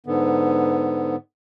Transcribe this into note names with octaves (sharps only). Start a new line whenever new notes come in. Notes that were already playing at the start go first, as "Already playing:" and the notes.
G#2 D3 B3